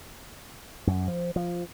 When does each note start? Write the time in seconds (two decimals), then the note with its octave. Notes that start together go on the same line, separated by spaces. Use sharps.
0.87 F#2
1.08 F3
1.36 F3